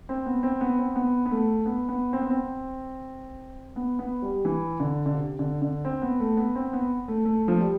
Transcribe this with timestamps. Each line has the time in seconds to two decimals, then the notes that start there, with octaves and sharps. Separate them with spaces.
0.09 C4
0.26 B3
0.43 C4
0.61 B3
0.79 C4
0.96 B3
1.26 B3
1.31 A3
1.66 B3
1.89 B3
2.13 C4
2.21 B3
2.30 C4
3.76 B3
3.99 B3
4.22 G3
4.45 E3
4.80 D3
5.06 D3
5.15 C3
5.39 D3
5.62 D3
5.85 C4
6.02 B3
6.20 A3
6.37 B3
6.55 C4
6.73 B3
7.08 A3
7.25 A3
7.48 F3
7.60 G3